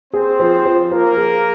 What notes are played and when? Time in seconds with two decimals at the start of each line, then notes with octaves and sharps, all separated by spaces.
0.13 C4 G#4 C5
0.40 F3
0.65 F3
0.91 F3 A#3 A#4
1.17 G#4